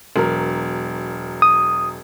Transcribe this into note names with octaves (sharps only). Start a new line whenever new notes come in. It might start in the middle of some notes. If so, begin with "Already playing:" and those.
E1 F#3 A#4
D#6